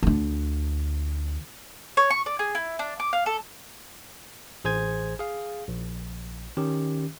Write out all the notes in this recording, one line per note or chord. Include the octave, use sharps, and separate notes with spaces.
D2 D3
C#5
C#6
D5
G#4
E4
D4
D6
F5
A4
A1 G#4 C5 G#5 G#6
G#4 F5
A#1
D#3 C#4 G4